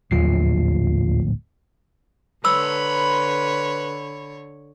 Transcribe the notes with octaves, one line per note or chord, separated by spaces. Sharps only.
D1 A#1 D#2 F#3 F4 C7
D3 B4 C#5 B5 C6 E6